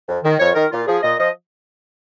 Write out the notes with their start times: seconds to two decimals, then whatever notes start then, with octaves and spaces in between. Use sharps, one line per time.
0.08 F2
0.24 D#3
0.39 F2 C#5
0.55 D#3 A#4
0.71 A#2 F4
0.87 F3 G#4
1.03 A#2 D#5
1.19 F3 D#5